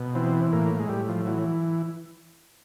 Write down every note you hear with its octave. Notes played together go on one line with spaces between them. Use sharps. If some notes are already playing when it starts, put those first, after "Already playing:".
Already playing: B2
E3 C4
A2 A#3
G#3
A2 G3
F3
E3 F#3